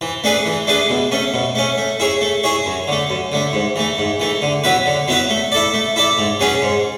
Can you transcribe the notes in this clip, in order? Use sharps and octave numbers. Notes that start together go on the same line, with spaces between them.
E3
A3 D4 G#4 B4
E3
A3 D4 G#4 B4
B2
A3 C#4
B2
A3 C#4
A3
E4 G#4 C#5
A3
E4 G#4 C#5
F#2
D3 A3
F#2
D3 A3
G#2
E3 A3
G#2
E3 A3
D3
F#3 B3 E4 B4
D3
F#3 B3 E4 B4
A3
E4 A4 D5
A3
E4 A4 D5
G#2
F#3 C#4 G#4 B4
G#2